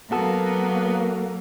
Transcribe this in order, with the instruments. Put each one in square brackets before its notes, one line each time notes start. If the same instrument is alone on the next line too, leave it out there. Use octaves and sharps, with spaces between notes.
[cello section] F#3 A#3 [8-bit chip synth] B3 [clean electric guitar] F#4 A4